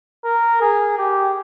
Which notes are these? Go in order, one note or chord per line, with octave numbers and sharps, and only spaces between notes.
A#4
G#4
G4